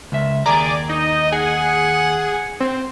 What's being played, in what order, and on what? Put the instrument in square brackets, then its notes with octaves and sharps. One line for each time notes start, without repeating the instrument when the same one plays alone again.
[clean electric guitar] C#2 E5
[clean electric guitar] D#2 A#4 A#5 [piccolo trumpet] G#4 [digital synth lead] D5
[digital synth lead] D#4 [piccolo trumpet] D#5
[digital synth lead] G#4 [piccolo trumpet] F#5
[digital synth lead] C4